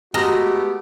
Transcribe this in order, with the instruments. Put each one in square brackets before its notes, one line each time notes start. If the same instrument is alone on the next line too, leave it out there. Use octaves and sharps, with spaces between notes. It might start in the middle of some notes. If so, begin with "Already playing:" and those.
[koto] G#3 A#5 [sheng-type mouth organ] A3 B3 [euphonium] F#4 [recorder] G4